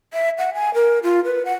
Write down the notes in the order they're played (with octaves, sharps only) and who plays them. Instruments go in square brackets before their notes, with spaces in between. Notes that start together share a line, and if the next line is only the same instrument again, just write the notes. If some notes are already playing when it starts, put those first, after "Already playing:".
[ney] E5
F#5
G#5
A#4
F4
B4
F#5